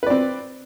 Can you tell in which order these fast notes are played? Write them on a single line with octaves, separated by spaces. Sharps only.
B4 D5 C4